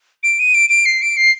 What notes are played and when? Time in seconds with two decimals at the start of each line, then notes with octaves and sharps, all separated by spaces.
0.23 D7
0.39 D#7
0.54 D7
0.70 D7
0.86 C7
1.02 D7
1.17 C7